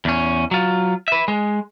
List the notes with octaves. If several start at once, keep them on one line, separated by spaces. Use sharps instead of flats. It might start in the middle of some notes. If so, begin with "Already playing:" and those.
E2 C#4
F#3 F4
B4 E5
G#3